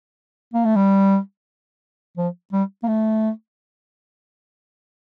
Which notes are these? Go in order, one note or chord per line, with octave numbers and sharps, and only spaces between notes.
A#3
A3
G3
F3
G3
A#3
A3